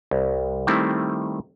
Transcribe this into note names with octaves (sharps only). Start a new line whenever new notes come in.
C2
D#3 G3 A3 C4 E4